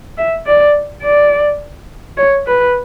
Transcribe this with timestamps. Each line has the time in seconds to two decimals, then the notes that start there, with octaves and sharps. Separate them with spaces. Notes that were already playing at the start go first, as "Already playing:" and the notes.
0.18 E5
0.46 D5
1.03 D5
2.18 C#5
2.47 B4